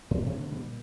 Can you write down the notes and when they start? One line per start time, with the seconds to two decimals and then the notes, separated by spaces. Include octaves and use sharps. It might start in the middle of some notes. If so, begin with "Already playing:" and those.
0.11 G#2
0.26 B2 D3 A3 B3
0.52 A#2 G3